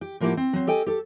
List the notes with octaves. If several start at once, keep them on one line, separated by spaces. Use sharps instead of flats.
G4
A2 F3 A#3 E4 G4 F#5
C4
F#3 C4
G4 A4 D#5 G5 G#5
G4 A4